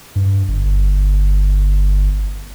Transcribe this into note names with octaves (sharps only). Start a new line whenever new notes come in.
G2
G1